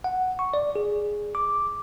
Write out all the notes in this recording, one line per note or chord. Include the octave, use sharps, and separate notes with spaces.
F#5
C#6
D5
G#4
D6